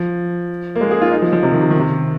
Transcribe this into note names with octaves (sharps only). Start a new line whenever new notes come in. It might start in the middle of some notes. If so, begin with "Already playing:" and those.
Already playing: F3
A#3
G#3
G#4
F4
D#4
F3
F3
C3
D#3
C3
D#3
C3